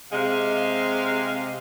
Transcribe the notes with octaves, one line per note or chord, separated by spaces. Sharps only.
C3 G#3 F5